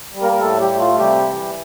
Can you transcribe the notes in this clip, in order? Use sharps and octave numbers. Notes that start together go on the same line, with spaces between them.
G3
A#3 A#4
A#4
A2 A3 A4
G3 G4
A3
F4
C3 G3 G4
E3